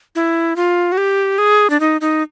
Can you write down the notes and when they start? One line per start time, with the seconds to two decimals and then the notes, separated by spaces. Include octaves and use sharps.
0.15 E4
0.56 F4
0.92 F#4
0.98 G4
1.38 G#4
1.70 D4
1.80 D#4
2.01 D#4